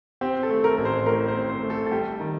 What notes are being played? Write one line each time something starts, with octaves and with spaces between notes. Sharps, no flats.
C4 G4
A4
A3
A#4
A1
C5
A2 A#4
C5
C4
C5
A3
A4
A4
G3 G4
D#3